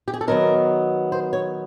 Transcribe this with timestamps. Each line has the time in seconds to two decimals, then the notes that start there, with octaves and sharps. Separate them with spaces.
0.08 G4
0.14 G#4
0.21 A4
0.28 D#3 F#3 B3 A#4
1.12 C5
1.33 C#5